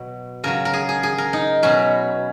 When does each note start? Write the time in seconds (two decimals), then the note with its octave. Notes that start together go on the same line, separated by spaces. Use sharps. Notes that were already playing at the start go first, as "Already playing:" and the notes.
Already playing: B2 F#3
0.44 C#3 F#3 A#4
0.65 A#4
0.73 G#4
0.89 G#4
1.03 G#4
1.18 A#4
1.33 D#4
1.63 B2 F#3 C#4